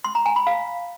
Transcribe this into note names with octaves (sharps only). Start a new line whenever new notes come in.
C6
A#5
G#5
B5
F5